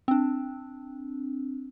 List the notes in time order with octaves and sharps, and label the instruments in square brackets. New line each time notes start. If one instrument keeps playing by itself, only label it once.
[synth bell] C4 D4